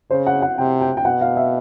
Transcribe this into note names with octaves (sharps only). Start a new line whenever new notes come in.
C#3 C5
F#5
F#5
C3 G5
G5
G5
B2 F#5
F5
E5